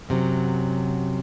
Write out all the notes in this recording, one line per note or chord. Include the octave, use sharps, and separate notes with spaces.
F#2 C3 D#3 F#3